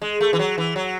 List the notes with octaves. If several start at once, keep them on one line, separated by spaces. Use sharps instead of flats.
G#3
A3
E3
F#3
E3
F#3